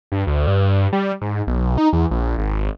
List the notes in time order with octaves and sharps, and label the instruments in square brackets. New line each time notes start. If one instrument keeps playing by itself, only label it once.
[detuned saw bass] G2
D2
G2
G3
G#2
B1
D#4
E2
A#1
G#1